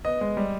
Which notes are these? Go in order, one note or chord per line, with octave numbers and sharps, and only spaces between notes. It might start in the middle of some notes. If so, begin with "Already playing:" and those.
B3 D#5
G#3
G3